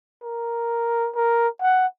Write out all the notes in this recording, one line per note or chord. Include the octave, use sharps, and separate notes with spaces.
A#4
A#4
F#5